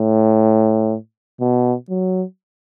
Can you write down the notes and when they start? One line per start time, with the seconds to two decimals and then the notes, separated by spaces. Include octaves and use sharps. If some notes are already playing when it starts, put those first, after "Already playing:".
Already playing: A2
1.40 B2
1.89 F#3